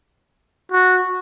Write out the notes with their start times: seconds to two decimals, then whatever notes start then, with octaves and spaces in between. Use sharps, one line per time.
0.72 F#4